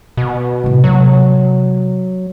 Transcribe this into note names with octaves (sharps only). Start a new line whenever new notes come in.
B2
A2 C3
C3 F#3 G#3